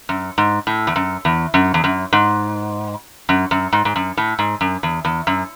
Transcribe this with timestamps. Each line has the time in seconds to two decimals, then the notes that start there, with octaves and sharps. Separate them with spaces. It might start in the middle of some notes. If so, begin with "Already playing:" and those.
0.09 F#2
0.38 G#2
0.67 A2
0.87 E2
0.96 F#2
1.25 E2
1.54 F#2
1.74 E2
1.84 F#2
2.13 G#2
3.29 F#2
3.51 F#2
3.73 G#2
3.85 G#2
3.96 F#2
4.17 A2
4.39 G#2
4.61 F#2
4.83 E2
5.05 E2
5.27 F#2